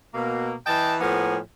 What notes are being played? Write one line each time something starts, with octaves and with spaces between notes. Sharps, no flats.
B2 A#3
E3 D#5 G5 A5
A2 F3 A#3 B3 G#5